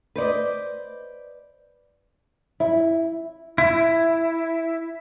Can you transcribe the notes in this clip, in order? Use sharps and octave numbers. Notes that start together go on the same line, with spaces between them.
B4 C5 D5 D#5
E4
E4